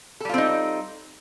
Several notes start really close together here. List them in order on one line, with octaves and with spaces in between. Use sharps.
A4 G3 F4 C4 D#4